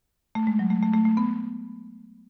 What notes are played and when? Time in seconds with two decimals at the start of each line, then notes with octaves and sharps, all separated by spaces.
0.35 A3
0.47 G#3
0.59 F#3
0.70 A3
0.83 A3
0.94 A3
1.05 A3
1.17 B3